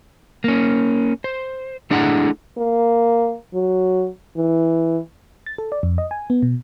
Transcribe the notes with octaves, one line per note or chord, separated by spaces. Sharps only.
A#3 C#4
C5
A3 D4 E4 G#4 F#5 A#5
A#3
F#3
E3
A6
A4
D5
F2
D#5
G#5
B3
B2